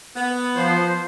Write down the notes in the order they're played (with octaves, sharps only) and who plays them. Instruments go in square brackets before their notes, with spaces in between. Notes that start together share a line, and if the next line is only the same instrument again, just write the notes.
[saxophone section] B3
[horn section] F3 C5